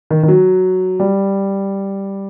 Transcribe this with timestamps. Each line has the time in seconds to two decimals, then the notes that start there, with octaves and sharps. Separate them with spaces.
0.10 D#3
0.23 D#3
0.28 F#3
1.00 G3